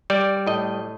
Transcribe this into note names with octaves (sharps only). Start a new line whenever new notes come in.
G3 D5
A2 D#5